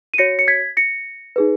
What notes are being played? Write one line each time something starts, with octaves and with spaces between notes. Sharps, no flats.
D#7
F#4 C#5 A#6 C#7
C#7
G#6 B6
A#6 C#7
D#4 G#4 B4